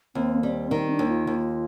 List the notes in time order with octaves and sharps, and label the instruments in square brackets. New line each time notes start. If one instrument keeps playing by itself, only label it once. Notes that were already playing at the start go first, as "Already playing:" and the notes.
[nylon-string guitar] D#2 [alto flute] C4
[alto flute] A#3
[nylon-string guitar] G3 [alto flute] C4
[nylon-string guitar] D#3 [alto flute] C4
[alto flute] D4
[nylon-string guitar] D#2
[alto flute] F4
[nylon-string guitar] D#2